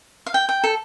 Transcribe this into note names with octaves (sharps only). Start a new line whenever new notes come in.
F5
G5
G5
A4